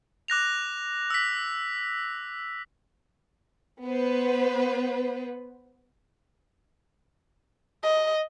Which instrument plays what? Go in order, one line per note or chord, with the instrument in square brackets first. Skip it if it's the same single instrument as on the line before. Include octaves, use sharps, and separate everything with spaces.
[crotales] D6 F#6 A#6 F7
E6 B6
[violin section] B3 B4 C5
[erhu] D#5